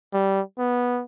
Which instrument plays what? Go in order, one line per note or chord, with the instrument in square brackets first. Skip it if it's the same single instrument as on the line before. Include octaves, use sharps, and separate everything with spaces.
[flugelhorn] G3
B3